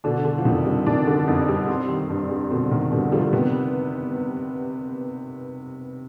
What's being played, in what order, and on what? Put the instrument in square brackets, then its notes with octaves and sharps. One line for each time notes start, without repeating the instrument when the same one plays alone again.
[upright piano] B2 D3 [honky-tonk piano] D4
[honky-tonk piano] D3
[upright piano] F3
[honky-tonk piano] F2 [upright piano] C3 D#3
[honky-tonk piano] G3
[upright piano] C3 D#3 [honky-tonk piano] D4
[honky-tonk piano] D3
F2
G3
C4
D#3
G2
G3
[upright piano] B2 D3 [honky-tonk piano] C4
[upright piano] G#2 C3 [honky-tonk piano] D#3
[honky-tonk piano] G2 [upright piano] B2 D3
[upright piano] D3 F3 [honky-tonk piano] G3
[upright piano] C3 D#3 [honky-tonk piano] B3